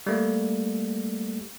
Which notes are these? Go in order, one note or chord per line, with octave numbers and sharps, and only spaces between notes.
G3 A3 A#3